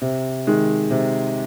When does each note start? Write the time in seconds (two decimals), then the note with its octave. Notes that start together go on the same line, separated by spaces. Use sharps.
0.01 C3
0.47 D#3 G#3
0.91 C3